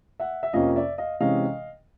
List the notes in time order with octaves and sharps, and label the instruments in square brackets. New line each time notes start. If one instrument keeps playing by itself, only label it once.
[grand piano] E5 F#5
E5
F2 C3 F3 A#3 C#4 D#5 F5
D5 E5
D#5 F5
C3 E3 G#3 C#4 D#5 F5